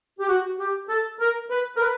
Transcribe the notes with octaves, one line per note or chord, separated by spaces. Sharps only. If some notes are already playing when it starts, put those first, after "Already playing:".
G4
F#4
G4
A4
A#4
B4
A#4
B4